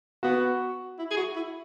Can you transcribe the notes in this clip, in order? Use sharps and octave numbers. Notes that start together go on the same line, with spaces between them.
B3 F#4
E4
G#4
F#4
E4